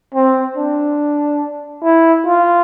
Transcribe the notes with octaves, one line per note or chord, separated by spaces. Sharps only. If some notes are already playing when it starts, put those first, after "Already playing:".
C4
D4
E4
F4